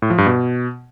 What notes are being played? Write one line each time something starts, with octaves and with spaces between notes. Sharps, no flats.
A2
F3
G2
B2